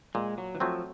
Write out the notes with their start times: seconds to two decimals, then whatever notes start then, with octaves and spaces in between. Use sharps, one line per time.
0.15 A#2 G#3
0.38 F#3
0.55 E3
0.60 F3 F#3 A3 C4